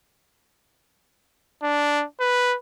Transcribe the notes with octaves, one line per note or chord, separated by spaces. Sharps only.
D4
B4